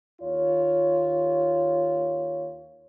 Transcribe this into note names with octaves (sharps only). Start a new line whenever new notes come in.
D#2 F4 C#5